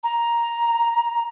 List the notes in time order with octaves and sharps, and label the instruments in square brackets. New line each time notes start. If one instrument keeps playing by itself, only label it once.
[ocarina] A#5